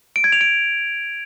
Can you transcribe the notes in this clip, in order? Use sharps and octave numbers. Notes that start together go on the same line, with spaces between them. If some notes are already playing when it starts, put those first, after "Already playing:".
D7
G#6
F7
D7